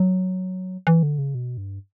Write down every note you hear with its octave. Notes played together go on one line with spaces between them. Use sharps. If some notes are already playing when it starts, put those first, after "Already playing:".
Already playing: F#3
E3
D3
C#3
B2
G2